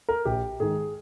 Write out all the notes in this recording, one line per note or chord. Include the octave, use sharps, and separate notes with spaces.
A#4
A#1 G4
G#2 D#3 G#4